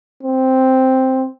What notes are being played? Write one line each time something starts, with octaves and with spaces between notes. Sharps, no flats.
C4